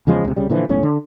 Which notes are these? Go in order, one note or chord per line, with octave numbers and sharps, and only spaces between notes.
E2 C#3 F3 G#3
C#2 C3
C2 C#3 G3
A#2 D3 E3 F3
E1 B1 A2 C#4
D3